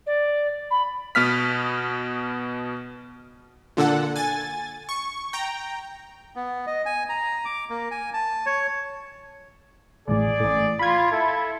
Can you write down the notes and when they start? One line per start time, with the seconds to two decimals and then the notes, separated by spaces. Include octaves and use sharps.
0.06 D5
0.70 B5
1.15 B2 B3 F6 B6
3.77 A#2 D3 A4 F#5
4.16 G#5 A6
4.89 C#6
5.33 G5 A#5
6.36 B3
6.67 D#5
6.86 G#5
7.09 A#5
7.45 D6
7.70 A#3
7.91 G#5
8.14 A5
8.46 C#5
10.08 A1 A2 G#4 D5
10.40 A1 A2
10.79 F4 B5 G#6
11.11 E4 A4